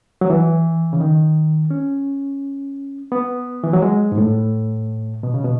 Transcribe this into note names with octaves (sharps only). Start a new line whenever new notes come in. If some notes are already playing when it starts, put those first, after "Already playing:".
F#3
E3
C#3
D#3
C#4
B3
E3
F#3
G#3
G#2
A2
B2
C#3
B2